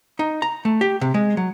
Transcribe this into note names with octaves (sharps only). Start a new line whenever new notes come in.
D#4
A#5
A3
G4
C3
G#3
F#3